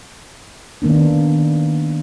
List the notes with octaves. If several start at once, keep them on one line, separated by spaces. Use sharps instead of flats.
D#3 A#3 B3 D4